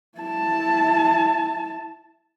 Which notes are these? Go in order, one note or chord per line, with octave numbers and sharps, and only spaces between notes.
E4 A5